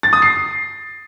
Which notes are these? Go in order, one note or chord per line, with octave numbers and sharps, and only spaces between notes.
A6
D#6
C7